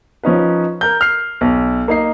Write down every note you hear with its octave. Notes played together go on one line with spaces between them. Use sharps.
F3 C#4 D#4 B4
A#4 G6
F6 C7
B1
A#3 D#4 C7